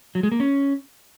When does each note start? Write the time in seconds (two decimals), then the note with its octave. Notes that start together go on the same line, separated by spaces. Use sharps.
0.15 F#3
0.23 G#3
0.32 A#3
0.40 C#4